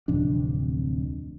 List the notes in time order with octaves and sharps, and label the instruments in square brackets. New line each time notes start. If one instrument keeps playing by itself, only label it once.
[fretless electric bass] D1 F2 C3 D4